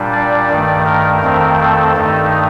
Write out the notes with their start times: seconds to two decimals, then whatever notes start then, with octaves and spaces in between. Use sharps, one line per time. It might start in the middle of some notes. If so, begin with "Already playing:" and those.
Already playing: A#2 G3 D4
0.13 D5
0.50 G2 D#3 A3
0.86 A#4
1.23 F2 D#3 A3 C4
1.60 A4
1.96 G2 D#3 A3 D#4